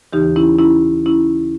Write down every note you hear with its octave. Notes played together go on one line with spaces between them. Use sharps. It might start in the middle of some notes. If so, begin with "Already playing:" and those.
D#2 C#3 E3 D#4 G4
C#4 E4
C#4 E4
C#4 E4